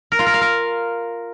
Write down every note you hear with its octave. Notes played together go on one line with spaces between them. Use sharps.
A#4
F4
A#4
F5
A#4